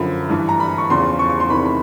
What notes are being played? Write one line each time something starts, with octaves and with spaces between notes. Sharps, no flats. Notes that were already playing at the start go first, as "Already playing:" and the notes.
Already playing: F#2 D3 F3 B5
G2 E3
A#5
B5
C#6
E2 C#3 F3 C6
C#6
C#6
C6
E2 C3 D#3 B5
B5